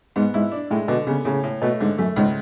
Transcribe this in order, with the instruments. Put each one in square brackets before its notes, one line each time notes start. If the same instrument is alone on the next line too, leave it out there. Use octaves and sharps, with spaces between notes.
[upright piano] G#2 [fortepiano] B3
[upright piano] G#2 [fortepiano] E4
[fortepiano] D4
[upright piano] A2 [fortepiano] G#3
[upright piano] B2 [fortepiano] D3
[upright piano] C#3 [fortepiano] B3
[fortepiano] A2 [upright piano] C#3
[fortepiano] A2
[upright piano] B2 [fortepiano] A3
[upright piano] G#2 [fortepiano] D3
[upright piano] F#2 [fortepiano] A3
[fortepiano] C#2 [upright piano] G#2